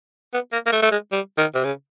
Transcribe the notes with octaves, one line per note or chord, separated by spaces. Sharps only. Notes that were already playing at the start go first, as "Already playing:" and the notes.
B3
A#3
A#3
A3
A3
G#3
G3
D#3
C3
C#3